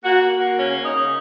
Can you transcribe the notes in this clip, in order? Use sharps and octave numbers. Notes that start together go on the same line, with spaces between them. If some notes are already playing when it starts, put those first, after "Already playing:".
A#3 F#4
A#3
A#3
C#3 C#4
A#3
D#4
C#3